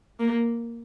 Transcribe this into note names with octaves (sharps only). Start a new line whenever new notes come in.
A#3